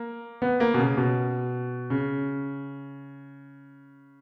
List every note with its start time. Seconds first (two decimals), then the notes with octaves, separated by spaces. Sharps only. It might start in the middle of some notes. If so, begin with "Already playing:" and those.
Already playing: A#3
0.42 B3
0.60 A#3
0.74 B2
0.79 C#3
0.97 B2
1.90 C#3